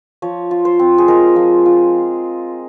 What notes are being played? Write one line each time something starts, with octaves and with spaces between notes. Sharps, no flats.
F3 C#5
F4
C5
C4
G#4
G#3 A#4
F3
F4